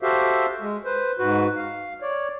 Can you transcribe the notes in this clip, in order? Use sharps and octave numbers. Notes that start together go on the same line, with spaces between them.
F#4 G4 A4 C5 E5 F5
G#3
B4 C5
G#2 F#4 B4
F5
C#5 D5